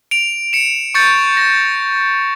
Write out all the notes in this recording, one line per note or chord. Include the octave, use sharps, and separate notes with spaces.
D7 F7
C#7 E7
C#6 G6 A6 C#7
A#6